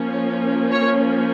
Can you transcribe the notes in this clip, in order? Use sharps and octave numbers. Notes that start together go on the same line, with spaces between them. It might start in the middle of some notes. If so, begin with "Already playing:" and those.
Already playing: F3 A#3 C#4
C#5